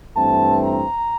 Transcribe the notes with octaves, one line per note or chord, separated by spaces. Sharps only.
G2 E3 A3 C4 A5
A#5